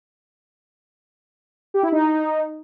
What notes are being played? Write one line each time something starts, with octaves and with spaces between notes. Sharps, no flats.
G4
E4
D#4